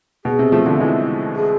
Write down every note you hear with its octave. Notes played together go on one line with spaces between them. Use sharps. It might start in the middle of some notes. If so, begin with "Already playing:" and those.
B2 G#4
C3
F3 A3
D3 F3
E3 G#3
G#4